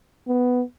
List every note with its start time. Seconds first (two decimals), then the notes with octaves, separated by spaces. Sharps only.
0.28 B3